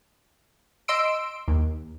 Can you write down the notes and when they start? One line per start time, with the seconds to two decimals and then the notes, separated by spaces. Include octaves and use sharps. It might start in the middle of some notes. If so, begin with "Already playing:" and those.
0.88 D#5 C6 E6 D7
1.48 D#2